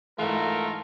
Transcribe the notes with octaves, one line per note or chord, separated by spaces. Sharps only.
G#2 E3 A3 F4 A#4